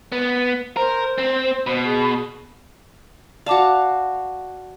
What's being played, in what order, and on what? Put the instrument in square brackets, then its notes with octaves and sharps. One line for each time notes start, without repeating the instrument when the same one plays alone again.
[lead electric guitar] B3
[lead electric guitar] A#4 [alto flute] C5
[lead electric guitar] C4
B2
[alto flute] G#4
[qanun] F#4 F5 [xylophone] D5 A5 D6